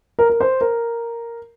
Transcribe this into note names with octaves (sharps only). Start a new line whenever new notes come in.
A#4
A#4
C5
A#4